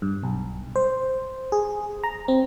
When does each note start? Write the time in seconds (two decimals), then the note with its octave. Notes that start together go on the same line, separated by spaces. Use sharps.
0.02 G2
0.23 B1
0.76 C5
1.52 G#4
2.03 A#5
2.28 C4